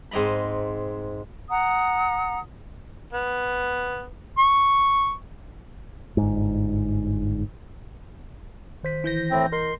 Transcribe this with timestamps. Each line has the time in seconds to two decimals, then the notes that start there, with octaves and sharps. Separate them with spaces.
0.11 G#2 C4 D#5 A#5 B5
1.50 F#5 A#5 D#6
3.13 B3
4.38 C#6
6.17 G1 G#2
8.83 D#3 C5 B6
9.04 E3 G6 A#6
9.31 A2 C4
9.52 A#4 D#5 C6